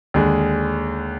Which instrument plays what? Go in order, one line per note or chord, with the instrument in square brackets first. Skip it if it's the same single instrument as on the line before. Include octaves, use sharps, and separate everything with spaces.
[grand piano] D#2 D3 G#3